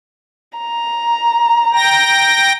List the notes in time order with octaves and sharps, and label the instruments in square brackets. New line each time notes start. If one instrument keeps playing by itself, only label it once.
[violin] A#5
[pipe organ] G5 A#6